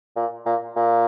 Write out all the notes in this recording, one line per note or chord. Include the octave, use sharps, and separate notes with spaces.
A#2
A#2
A#2